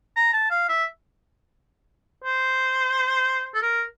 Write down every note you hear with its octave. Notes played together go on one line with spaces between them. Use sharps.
A#5
A5
F5
E5
C5
A4
A#4